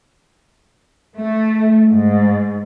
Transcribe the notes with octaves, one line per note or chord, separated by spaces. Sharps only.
A3
G#2